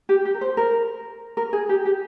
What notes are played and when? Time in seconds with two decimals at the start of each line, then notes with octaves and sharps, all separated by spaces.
0.09 G4
0.25 G4
0.34 A#4
0.41 C5
0.57 A#4
1.37 A#4
1.53 G#4
1.69 G4
1.85 G4